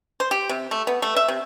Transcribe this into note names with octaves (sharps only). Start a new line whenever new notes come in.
C5
G4
C3
A3
B3
A3
E5
C3